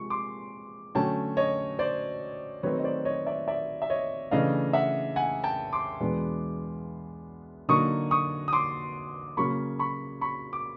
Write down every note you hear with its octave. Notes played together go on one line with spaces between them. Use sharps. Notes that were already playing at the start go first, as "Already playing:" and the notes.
Already playing: C3 F3 G#3 C#6
C6 D6
D3 F#3 A3 C#4 G5 A5
C#5 D#5
C5 D5
D#3 F#3 A3 C4 D#4 B4 C#5
D#5
C5 D5
C#5 D#5
D5 E5
D5 E5
E5
C#5 D#5
C#3 E3 A3 D4 D#5 F5
E5 F#5
F#5 G#5
G5 A5
C6 D6
E2 B2 G#3 B3 D4
D3 F#3 A#3 D#4 C#6 D#6
C#6 D#6
D#6
C6 D6
C#3 F#3 A#3 B5 C#6
B5 C#6
B5 C#6
D6